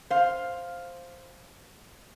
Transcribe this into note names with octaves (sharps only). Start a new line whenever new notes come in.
C5 F5